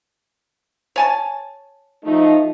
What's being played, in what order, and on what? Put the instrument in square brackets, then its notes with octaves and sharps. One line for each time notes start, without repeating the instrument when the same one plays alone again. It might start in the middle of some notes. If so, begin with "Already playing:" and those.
[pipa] C#5 G#5 A5
[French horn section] F3 A3 D#4